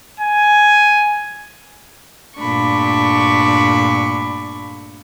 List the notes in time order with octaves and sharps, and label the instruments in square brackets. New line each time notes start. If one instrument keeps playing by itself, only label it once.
[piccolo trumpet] G#5
[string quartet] G2 A#2 A3 D4 B5 C#6